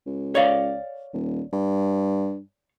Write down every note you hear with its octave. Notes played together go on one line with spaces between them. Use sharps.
C#2
C#5 D5 F5
D#1
G2